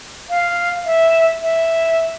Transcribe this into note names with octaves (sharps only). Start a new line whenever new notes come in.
F5
E5
E5